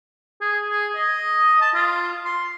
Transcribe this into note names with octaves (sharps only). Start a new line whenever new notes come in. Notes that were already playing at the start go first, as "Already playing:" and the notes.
G#4
G#4
D#5
A5
F4
C6